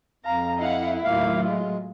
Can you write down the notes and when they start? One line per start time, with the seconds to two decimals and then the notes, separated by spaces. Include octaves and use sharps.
0.25 F2 F5 A#5
0.57 E4 D#5 F5 F#5
1.04 D#2 A2 F#3 A#3 F4 F5
1.44 G#3